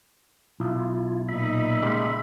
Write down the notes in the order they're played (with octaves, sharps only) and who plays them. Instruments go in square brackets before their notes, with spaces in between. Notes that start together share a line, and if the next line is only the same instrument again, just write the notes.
[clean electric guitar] B1 [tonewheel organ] E4 F4
[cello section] A#2 D#4 [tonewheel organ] E5 B5
[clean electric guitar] C#3 G3 G#3